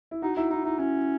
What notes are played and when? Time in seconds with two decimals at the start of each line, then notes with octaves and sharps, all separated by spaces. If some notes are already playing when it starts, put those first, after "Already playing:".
0.11 E4
0.22 D#4 F#4
0.36 D#4 E4
0.50 D#4 E4
0.64 D#4 E4
0.78 C#4 E4